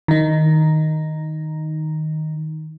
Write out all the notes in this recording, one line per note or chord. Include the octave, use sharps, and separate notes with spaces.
D#3 D#4